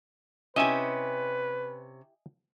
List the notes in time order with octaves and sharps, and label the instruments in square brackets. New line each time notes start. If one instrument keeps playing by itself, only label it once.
[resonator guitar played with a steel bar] C3 C#4 [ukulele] E4 G4 [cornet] B4 [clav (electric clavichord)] D#5 E5 G#5